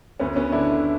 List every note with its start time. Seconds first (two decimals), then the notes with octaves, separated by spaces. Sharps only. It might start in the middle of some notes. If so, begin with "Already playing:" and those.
0.20 D2 B3 C#4
0.36 B3 C#4
0.52 D3 D4 E4